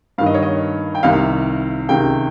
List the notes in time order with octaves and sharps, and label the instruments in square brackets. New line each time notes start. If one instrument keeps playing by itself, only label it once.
[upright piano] G2 D#3 F5
D#5
C#5
D#5
G5
C2 C3 D#3 F5
C#2 C3 D#3 G5